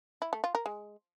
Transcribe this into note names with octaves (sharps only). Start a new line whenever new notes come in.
E4
A3
F4
A#4
G#3